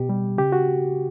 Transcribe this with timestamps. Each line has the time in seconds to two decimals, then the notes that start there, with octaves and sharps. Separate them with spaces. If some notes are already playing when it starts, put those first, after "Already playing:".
Already playing: B2 G4
0.09 G3
0.38 C#3 G4
0.52 F#4